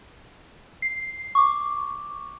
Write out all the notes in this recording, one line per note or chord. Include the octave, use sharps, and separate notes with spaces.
C7
C#6 D6